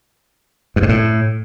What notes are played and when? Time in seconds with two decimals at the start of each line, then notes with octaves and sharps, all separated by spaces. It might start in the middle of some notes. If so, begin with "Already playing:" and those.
0.76 G2
0.83 G#2
0.89 A2